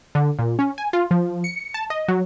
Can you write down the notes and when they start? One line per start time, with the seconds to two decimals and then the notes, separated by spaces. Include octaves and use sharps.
0.15 D3
0.39 A#2
0.59 C#4
0.78 G#5
0.93 F4
1.11 F3
1.44 C#7
1.74 A5
1.90 D#5
2.08 F#3